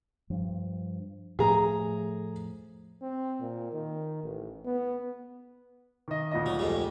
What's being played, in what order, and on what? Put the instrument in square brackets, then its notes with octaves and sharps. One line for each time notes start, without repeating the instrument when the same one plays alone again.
[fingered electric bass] G2 F3
[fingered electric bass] A2 F3 A3 [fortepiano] G#4 A#5
[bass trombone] C4
A#2
D#3
A1
B3
[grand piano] D#3 D#5
D2 A#2 D#5
[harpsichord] F#3
F2 G#2 G3